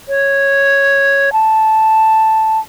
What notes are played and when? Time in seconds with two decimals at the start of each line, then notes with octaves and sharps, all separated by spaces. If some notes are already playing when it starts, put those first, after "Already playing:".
0.08 C#5
1.33 A5